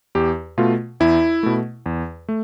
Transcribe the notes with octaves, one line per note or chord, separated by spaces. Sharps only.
E2 G4
B2 A3 F4
E2 E4
B2 A3
E2
A3